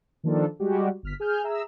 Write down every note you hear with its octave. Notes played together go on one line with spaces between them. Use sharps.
D#3 F3 A#3 D4 F4 A4
G3 G#3 F#4 G4
G1 F6 B6
G#4 G#5 F6 G6
G#4 E5 A#5 E6